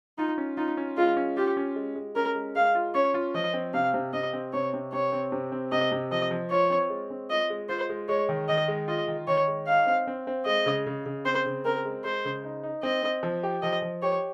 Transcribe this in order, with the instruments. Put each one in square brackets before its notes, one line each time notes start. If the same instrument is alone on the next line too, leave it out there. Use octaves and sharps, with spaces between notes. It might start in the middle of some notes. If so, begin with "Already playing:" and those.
[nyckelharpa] D#4 [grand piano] F4
[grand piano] C#4
[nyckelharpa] D#4 [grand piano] F4
[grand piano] C#4
[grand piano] G#3 [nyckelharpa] F4
[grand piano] C#4
[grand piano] F4 [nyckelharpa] G4
[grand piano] C#4
G#3
G#3
[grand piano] C#4 [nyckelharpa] A#4
[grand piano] G#3
[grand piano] G#3 [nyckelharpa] F5
[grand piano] F4
[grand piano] C#4 [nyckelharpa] C#5
[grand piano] F4
[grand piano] F3 [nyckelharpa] D#5
[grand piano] C4
[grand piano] C3 [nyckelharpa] F5
[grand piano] C3
[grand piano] C3 [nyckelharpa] D#5
[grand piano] C4
[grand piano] C3 [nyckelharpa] C#5
[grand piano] C3
[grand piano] C3 [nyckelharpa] C#5
[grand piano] C4
C3
C4
[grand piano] C3 [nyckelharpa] D#5
[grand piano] C3
[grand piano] F3 [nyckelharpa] D#5
[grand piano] F3
[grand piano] F4 [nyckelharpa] C#5
[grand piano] C4
G#3
C4
[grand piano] F4 [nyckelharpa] D#5
[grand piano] G#3
[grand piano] F4 [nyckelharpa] C5
[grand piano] G#3
[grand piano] G#3 [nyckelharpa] C#5
[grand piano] D#3
[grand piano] D#3 [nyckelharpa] D#5
[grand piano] G#3
[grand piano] F4 [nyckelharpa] D#5
[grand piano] D#3
[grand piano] D#3 [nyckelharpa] C#5
[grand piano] G#3
[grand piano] D#4 [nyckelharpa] F5
[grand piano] C4
C4
C4
[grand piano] G#3 [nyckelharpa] D#5
[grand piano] C#3
C#3
C#3
[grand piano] C4 [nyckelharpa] C5
[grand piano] C#3
[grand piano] C4 [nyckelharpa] A#4
[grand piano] G#3
[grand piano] G#3 [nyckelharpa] C5
[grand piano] C#3
D#4
D#4
[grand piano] C4 [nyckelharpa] D#5
[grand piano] C4
F3
G4
[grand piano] F3 [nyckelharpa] D#5
[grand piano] F3
[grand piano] G4 [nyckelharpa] C#5